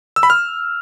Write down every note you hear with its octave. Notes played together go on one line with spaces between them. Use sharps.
E6
B5
F6